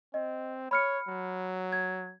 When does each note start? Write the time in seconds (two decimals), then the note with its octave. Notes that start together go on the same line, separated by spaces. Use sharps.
0.14 C4 D#5
0.71 C#5 B5 F6 C#7
1.08 F#3
1.72 G#6